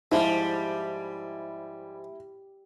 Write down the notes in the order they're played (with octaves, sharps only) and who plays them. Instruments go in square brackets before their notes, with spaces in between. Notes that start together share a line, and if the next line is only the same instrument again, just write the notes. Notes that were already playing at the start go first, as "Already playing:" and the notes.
[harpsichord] G#2 F3 [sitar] G3 [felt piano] E4